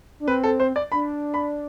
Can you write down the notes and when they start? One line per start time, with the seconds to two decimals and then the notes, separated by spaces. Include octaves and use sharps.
0.20 D4
0.28 C4 B4
0.44 A4
0.60 C5
0.76 D5
0.92 D4 B5
1.34 B5